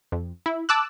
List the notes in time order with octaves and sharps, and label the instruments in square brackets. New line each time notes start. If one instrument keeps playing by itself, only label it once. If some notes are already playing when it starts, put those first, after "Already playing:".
[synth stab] F2
E4
A5 D6 E6 F#6